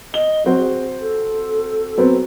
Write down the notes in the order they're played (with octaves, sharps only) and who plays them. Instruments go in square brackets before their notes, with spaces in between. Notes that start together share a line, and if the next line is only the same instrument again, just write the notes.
[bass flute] D#5 [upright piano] G7
[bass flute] F#3 [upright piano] C4 F#4
[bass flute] G#4
A4
[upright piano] F#3 B3 C4